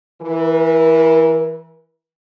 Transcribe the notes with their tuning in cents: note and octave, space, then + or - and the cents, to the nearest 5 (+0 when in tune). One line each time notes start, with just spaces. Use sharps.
E3 +0 A#4 +45